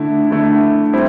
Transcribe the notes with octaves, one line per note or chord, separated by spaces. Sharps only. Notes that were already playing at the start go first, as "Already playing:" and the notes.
Already playing: D3 A3 E4
D3 A3 E4
G3 C4 E4